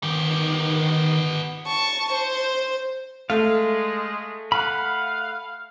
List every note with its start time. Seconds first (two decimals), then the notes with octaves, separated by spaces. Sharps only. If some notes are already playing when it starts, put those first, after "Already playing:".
0.03 D#3 B3 G4
1.67 A5 C#6
2.12 C5
3.30 G#3 A3 F5
4.52 F5 F#5 B5